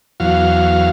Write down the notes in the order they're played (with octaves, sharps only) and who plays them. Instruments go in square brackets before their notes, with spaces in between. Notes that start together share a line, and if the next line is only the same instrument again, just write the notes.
[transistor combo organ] E2 F#3 F5